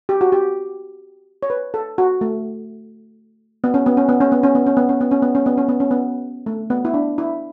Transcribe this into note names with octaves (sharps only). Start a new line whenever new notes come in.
G4
F#4
G4
C#5
B4
A4
F#4
A3
B3
C#4
B3
C#4
B3
C#4
B3
C#4
B3
C#4
B3
C#4
B3
C#4
B3
C#4
B3
C#4
B3
C#4
B3
A3
B3
E4
D4
E4